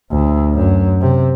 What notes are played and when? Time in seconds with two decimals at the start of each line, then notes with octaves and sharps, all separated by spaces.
0.12 D2
0.55 F#2
1.01 C3